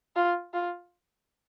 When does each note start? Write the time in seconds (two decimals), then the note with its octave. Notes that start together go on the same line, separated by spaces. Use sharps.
0.16 F4
0.53 F4